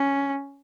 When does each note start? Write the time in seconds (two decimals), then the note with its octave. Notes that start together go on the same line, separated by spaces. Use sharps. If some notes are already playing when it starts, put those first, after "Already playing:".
Already playing: C#4